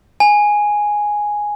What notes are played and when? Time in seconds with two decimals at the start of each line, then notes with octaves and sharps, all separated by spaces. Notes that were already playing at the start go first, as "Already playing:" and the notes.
0.20 G#5